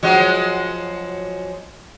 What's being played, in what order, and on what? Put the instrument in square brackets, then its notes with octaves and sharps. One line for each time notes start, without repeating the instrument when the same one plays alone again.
[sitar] F3 F#3 G#3